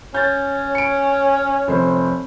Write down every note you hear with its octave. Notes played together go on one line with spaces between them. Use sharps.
C#4 C#5 G6 A6
C#7 D7
F1 C5